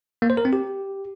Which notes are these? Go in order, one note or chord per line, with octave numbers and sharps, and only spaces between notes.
A#3
C5
A#4
C4
G4